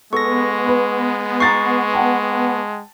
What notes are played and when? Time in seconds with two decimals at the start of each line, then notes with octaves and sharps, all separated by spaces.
0.13 G#3 B3 A4 C#6 A#6
0.68 B4
1.40 A#5 C#6 A6 C7
1.93 F#5 G5 A5